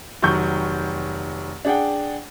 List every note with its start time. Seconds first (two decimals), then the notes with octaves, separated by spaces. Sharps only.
0.22 F1 D#3 F#3 C#6 G6
1.65 D4 G#4 F#5 G5